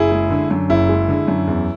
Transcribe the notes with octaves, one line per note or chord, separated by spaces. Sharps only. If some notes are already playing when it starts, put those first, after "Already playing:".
Already playing: F#1 E4 G#4
G#3
D3
F#2
F#1 E4
G#3
D3
F#2
E2